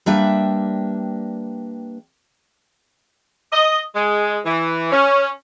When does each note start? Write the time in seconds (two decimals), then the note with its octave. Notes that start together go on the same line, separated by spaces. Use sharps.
0.06 G3 A#3 D4 B4 E5 G5
3.53 D#5
3.95 G#3
4.46 E3
4.92 C#4